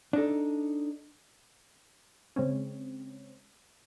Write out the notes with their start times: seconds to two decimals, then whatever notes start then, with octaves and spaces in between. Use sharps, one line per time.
0.13 D4 D#4 A4
2.36 C#3 G#3 C4 C#4